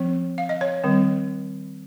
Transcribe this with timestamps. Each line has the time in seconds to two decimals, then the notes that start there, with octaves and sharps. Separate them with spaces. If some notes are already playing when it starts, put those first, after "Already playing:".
Already playing: F3 C4
0.38 F5
0.49 D#5
0.61 C#5
0.84 D#3 G3 C4